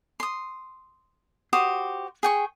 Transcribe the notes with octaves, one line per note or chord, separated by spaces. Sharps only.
C6 D#6
F#4 G4 C5 D#6
G#4 G5 C#6